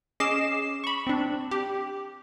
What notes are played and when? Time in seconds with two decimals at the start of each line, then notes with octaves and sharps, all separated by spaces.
0.20 C#4 G#4 D#5 D6 C7 E7
0.84 B5 C#6
1.07 C4 D4
1.51 G4